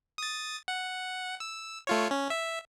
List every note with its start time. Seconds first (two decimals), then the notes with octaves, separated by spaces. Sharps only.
0.18 D#6 A6
0.68 F#5
1.40 E6
1.87 A3 F4 C#5
2.11 C#4
2.30 E5